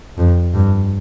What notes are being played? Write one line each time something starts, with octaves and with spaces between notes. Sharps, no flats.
F2
G2